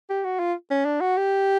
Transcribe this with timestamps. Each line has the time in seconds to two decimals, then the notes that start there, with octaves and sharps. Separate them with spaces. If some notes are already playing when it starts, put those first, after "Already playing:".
0.10 G4
0.24 F#4
0.40 F4
0.71 C#4
0.85 D4
1.01 F#4
1.17 G4